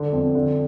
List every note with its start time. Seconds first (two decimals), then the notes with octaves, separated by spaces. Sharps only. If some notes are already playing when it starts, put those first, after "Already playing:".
Already playing: D3
0.13 F2
0.35 D3